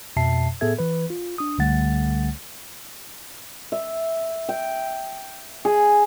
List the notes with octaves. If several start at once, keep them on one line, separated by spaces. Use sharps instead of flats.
F2 B2 E5 A5 C7
A2 B3 G#4 A4 E5 G#6
E3 B4
F4
D4 D#6
C#2 D3 G3 A3 F#5 A6
E5
G5
G#4